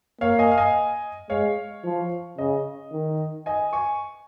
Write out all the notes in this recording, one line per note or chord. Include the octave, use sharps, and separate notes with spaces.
A#3 C#5 F5
D#5 G#5
F5
D#5 G#5
G#3 C#5 F5
F3
C#3 D#5
D#3
D#5 G#5
G#5 C#6